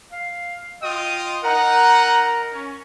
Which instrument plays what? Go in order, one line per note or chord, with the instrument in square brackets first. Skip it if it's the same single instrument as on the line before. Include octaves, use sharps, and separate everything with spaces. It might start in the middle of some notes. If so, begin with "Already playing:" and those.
[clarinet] F5
[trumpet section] F4 G5 D#6 [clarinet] D#5
[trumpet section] D#4 F#5 [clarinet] A#4 [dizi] A#5
[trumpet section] C#4